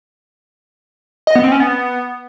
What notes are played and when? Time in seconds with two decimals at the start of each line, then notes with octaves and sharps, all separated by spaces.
1.27 D#5
1.35 B3
1.44 C4
1.52 C#4
1.60 B3